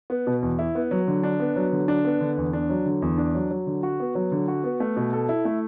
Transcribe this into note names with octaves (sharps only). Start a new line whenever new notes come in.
B3
B2
E2
E4
B3
F#3
D3
D4
B3
F#3
D3
D4
B3
D3
E2
D4
F#3
D3
E2
D4
F#3
F#3
D3
F#4
B3
F#3
D3
F#4
B3
A3
B2
A4
E4
A3